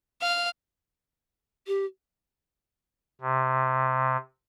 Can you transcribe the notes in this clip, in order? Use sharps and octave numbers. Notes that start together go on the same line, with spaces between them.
F5
G4
C3